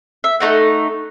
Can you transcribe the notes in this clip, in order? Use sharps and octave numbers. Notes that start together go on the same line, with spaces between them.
E5
A3 D#4 F#5